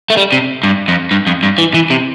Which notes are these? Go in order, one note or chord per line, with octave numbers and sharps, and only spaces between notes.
A3
G3
C3
G2
F2
G2
F2
G2
E3
E3
C3